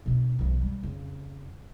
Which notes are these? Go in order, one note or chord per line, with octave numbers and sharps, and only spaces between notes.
B2 D4
B1 E3
G3
F2 C#3